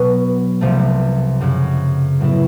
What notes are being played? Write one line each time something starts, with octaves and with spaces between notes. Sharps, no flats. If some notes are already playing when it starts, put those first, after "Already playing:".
Already playing: B2 F#3 B3
C2 C3 F3 A3
F#2 C#3 F#3
A2 F#3 B3 E4